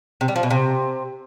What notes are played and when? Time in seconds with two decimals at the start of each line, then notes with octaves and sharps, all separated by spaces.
0.21 C3
0.28 G3
0.36 F3
0.43 B2
0.50 C3